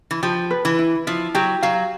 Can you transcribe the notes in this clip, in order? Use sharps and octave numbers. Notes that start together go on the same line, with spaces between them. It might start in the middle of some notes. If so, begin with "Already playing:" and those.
E3
F3 G4
B4
E3
E4
F3 E4
F#3 G4
F#3 F5